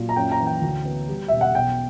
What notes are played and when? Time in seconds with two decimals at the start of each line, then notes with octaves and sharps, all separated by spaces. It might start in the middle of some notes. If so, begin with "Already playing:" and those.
Already playing: A#2 F#3
0.09 A#5
0.16 F#2 G5
0.31 A#5
0.40 E3
0.46 G5
0.62 D2
0.85 B3
1.09 G3
1.28 E1 E5
1.41 F#5
1.54 B1 G5